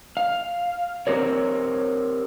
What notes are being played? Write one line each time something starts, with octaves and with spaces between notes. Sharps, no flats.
F5
C4 G4 A#4 C#5